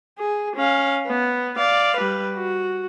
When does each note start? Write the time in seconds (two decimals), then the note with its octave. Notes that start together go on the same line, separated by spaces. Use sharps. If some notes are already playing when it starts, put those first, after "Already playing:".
0.18 G#4
0.56 C#4 F5
1.07 B3
1.57 D5 F5
1.97 G3 B4
2.36 F#4